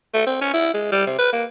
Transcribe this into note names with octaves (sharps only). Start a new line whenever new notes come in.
A3
C4
C#4
E4
G#3
G3
C3
B4
A#3